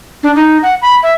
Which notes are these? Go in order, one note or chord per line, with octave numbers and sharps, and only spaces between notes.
D4
D#4
F#5
B5
E5